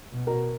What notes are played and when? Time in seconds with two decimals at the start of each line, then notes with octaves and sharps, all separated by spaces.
0.12 B2
0.27 F#4 A#4